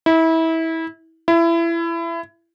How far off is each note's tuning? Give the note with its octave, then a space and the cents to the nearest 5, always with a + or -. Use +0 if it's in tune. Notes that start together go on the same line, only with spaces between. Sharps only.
E4 -25
E4 +25